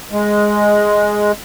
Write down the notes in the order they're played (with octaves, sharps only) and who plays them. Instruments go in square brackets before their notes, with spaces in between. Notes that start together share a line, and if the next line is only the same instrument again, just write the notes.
[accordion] G#3